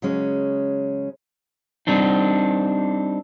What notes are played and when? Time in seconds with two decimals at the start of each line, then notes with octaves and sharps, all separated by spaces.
0.02 C#3 F#3 G#3 C#4
1.87 G3 C4 D4 D#4